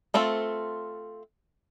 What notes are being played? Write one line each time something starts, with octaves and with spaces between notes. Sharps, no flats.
A3 C4 F4 A4